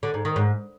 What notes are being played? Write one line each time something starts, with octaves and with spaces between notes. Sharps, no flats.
D3
G#2
D#3
G#2